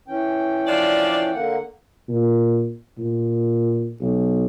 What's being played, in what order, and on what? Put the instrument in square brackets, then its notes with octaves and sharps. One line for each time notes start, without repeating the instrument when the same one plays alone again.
[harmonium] E3 C#4 G5
[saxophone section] F3 D4 D5
[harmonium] D3 A#3 F#5
[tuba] A#2
A#2
B1